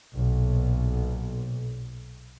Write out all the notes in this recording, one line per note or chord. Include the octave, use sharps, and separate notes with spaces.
B1 A#2